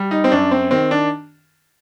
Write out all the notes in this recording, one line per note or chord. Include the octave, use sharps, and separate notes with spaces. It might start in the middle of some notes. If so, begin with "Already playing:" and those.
Already playing: G3
D#4
C4
F#2 D4
C4
D#3 C4
D4